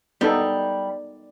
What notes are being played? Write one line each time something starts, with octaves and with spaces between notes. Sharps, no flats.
G3 B3 D#4 A4